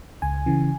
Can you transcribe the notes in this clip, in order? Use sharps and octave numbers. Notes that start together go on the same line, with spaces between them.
C#2 G#5
C#3 E3